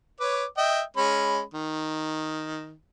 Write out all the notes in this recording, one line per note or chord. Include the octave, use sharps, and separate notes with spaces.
B4 C#5 D6
D#5 E5 G5
G#3 C#4 B5
D#3